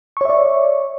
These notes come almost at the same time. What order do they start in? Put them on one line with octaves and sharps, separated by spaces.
C#6 C#5 E5 D5